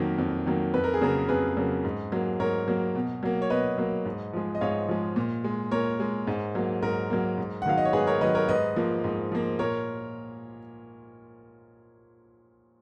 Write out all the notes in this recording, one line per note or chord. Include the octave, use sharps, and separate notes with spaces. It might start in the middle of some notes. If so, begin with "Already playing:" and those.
Already playing: F2 D#3 F#3 A#3
F2
D#3 F#3 A#3
F2 B4
A#4
G#4
C#3 F#3 A#3 A#4
F2 G#4 B4
C#3 F#3 A#3
G#2
F#3 A#3
G#2 A#4 C#5
F#3 A#3
B2
F#3 A#3
C#5
B2 B4 D#5
F#3 A#3
G#2
F3 G#3
D#5
G#2 C#5 F5
F3 G#3
A#2
G#3
A#2 A#4 C#5
G#3
G#2
F#3 A#3
G#2 A#4
F#3 A#3
G#2
F#5
D#3 F#3 F5
D#5
C#5
G#2 G#4 B4
A#4 C#5
D#3 F#3 B4 D#5
A#4 C#5
G#2 B4 D#5
F3 A#3
G#2
F3 A#3
A#2 A#4 C#5